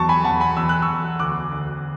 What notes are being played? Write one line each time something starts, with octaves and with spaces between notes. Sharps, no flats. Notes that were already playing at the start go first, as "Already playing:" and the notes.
Already playing: E2 F#3 A5 C#6
G#5 B5
E2 F#5 A5
G#5 B5
E2 E6
F#6
C#6 E6
E2
D2 D6 F#6
D2